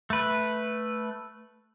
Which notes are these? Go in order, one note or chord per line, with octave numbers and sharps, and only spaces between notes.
A3 B4